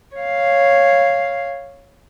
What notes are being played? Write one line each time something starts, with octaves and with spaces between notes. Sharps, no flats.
C#5 F5